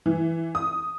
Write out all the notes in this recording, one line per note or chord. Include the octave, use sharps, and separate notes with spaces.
E3
D#6